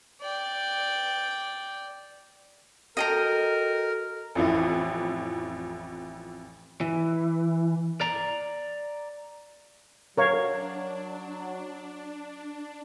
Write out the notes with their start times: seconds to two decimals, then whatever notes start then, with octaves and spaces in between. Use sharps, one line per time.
0.21 D5 G5
2.97 F#4 A4 A#4 D#5 G5 A#5
4.35 A1 F2 E3 E4
6.81 E3
8.01 D5 A#5
10.17 F#3 D4 A#4 C#5 F5